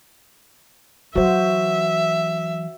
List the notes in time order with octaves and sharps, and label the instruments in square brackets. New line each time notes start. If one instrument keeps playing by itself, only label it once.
[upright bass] E3 F#3 [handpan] F#4 C5 [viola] E5